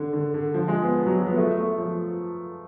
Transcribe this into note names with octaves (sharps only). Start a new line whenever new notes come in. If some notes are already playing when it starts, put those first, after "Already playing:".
Already playing: D3
D3
D3
F3
G#3
B3
F#3
F3
B3
A3
A3
F3